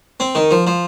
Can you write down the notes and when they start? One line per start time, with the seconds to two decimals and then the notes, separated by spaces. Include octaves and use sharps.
0.20 C4
0.35 D#3
0.51 F3
0.67 F3